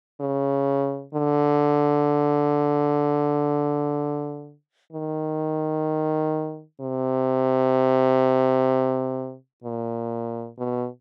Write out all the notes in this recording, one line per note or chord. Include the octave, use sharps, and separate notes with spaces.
C#3
D3
D#3
C3
A#2
B2